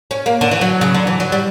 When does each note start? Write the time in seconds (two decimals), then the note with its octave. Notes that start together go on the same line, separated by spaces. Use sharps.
0.11 C#4
0.26 A#3
0.41 D3
0.51 E3
0.61 F#3
0.81 C#3
0.94 D3
1.07 E3
1.20 F#3
1.32 G3